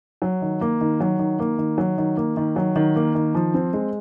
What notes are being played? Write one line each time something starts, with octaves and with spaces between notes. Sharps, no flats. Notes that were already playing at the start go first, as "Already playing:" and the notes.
F#3
D#3
A#3
D#3
F#3
D#3
A#3
D#3
F#3
D#3
A#3
D#3
F#3
D#3
A#3
D#3
F3
C4
G#3